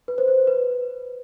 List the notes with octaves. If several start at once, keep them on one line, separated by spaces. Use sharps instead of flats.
B4
C5
C5
B4